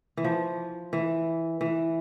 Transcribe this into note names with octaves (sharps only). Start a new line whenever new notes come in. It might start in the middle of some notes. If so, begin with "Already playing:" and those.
E3
F3
E3
E3